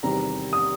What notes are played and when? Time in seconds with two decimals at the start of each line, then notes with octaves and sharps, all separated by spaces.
0.03 E2 C3 D#3 G3 A#5
0.53 D#6